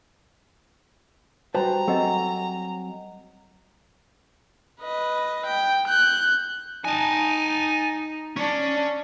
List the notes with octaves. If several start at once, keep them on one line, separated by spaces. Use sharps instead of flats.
G3 F#4 B4 C5 G5 A5 A#5
F#3 C4 A4 D#5 F#5 G#5
B4 D#5
G5
F#6 G6
D#4 G#5 A5
C#4 D4